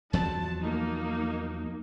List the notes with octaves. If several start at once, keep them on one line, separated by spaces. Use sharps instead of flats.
E2 F3 F#3 A5
A#3 D#4